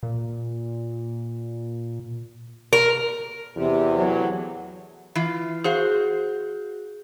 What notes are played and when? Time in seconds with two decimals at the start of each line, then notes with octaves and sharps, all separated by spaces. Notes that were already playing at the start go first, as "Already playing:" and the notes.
0.03 A#2
2.73 A#4
3.56 E2 C3
3.96 A2 E3 F#3
5.15 E3 F4
5.64 F#4 G#4 C5 F5